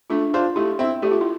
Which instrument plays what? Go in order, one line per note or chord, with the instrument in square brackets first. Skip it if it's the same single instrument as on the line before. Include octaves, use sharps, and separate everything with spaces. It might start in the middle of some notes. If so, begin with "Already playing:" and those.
[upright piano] A3 [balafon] D4 F4
[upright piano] D4 F4 C5
[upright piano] A3 [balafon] E4 G4
[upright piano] C4 E4
[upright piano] A3 [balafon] G4
[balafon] F4
E4